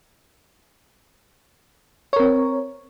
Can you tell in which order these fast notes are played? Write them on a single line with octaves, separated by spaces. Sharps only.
C#5 A#4 C4